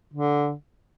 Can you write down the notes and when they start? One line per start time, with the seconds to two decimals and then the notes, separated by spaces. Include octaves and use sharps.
0.14 D3